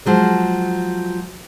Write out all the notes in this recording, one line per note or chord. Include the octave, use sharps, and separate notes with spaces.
F3 F#3 G#3